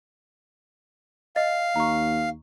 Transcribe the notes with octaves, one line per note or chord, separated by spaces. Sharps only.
D#5 F5 A6
D#2 A#5 C#6